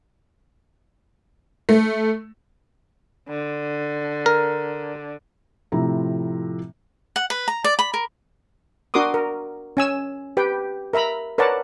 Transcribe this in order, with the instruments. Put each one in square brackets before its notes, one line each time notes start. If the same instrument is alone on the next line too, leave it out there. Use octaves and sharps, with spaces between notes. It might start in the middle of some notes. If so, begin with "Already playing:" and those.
[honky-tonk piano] A3
[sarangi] D3
[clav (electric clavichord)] A#4
[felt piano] A2 C3 F3 A3 E4 A#5
[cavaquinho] F#5
B4
A#5
D5
B5
A#4
[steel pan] D4 F#4 A#4 C6 D6 D#6
A#4
C#4 G#5 E6
G4 B4 G5
A#4 E5 A#5 B5
A#4 B4 C#5 D5 F#5 A5